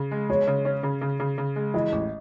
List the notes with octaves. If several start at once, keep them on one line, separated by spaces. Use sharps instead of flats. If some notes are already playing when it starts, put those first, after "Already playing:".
Already playing: C#3
G#3
G#3 C#5
C#3
C#4
C#3
C#3
C#3
C#3
G#3
E3 D#5
A1